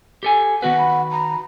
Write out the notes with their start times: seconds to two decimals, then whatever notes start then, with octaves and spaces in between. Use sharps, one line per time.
0.23 G4 A4 G#5
0.62 D#3 B3 F#4 B4 F#5
0.78 B5
1.11 A#5